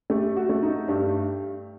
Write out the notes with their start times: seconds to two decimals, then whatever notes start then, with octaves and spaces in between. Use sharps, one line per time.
0.10 A3 G4
0.36 F#4
0.49 A3
0.63 D#4
0.88 G2 G4